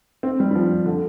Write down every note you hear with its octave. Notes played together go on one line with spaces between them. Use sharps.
C4
G3
G3
F3
D3